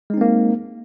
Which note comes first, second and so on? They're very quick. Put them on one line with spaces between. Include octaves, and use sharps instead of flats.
G#3 D#4 C4 A#3